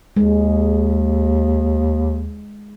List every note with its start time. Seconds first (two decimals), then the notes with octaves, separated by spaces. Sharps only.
0.16 D#2 G#3